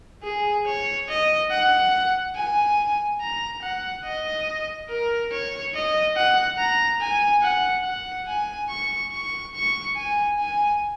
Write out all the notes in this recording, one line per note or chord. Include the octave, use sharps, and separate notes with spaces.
G#4
C#5
D#5
F#5
G#5
A#5
F#5
D#5
A#4
C#5
D#5
F#5
A#5
G#5
F#5
F#5
G#5
C#6
C#6
C#6
G#5
G#5